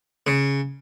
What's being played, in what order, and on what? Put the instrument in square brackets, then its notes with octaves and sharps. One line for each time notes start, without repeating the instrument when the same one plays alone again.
[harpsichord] C#3